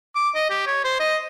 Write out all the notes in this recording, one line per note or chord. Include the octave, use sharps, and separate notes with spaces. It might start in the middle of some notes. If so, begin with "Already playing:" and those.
D6
D#5
G4
C#5
C5
D#5